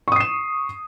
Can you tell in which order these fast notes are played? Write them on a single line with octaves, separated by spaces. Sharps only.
C#6 D#6 C7 E7